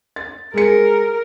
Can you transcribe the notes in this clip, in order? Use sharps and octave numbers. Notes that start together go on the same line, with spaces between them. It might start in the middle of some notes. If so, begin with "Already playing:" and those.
A6
G#3 G#4 A#4 C#7